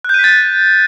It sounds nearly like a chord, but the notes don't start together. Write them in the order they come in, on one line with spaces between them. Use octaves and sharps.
F#6 G6 D#7 B6 A6